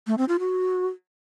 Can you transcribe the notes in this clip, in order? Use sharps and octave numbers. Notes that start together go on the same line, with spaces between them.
A3
C4
F4
F#4